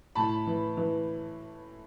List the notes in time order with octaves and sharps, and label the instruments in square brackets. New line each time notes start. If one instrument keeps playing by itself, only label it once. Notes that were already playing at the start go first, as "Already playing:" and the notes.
[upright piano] A2 A5 B5
E3
E3